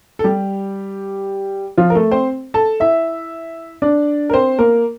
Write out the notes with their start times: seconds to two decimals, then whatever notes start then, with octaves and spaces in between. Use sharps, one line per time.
0.19 A4
0.24 G3 G4
1.77 F3 F4
1.90 A#4
1.95 A3 A4
2.11 C4 C5
2.54 A4 A5
2.80 E4 E5
3.82 D4 D5
4.30 A#4
4.33 C4 C5
4.59 A#3 A#4